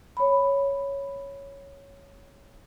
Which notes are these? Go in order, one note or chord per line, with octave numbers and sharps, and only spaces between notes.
C#5 B5